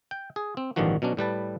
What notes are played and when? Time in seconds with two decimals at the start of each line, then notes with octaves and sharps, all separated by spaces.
0.11 G5
0.36 G#4
0.57 C4
0.76 A1 G2 D3 D#3 F3 F#4
1.02 B2 F#3 C#4 D4
1.17 A2 G3 B4 A5